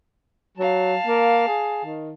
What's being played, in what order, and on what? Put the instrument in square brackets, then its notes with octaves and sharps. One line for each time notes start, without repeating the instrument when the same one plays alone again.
[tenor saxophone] F#3 [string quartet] F5 A5
[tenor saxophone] A#3
G#4
D#3